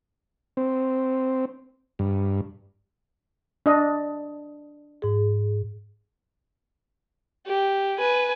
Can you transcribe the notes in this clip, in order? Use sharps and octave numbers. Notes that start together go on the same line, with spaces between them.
C4
G2
D4 D#5
G#2 G#4
G4
B4 G#5